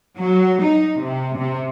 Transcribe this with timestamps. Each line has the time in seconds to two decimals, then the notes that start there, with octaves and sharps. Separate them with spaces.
0.18 F#3
0.63 D#4
1.01 C3
1.38 C3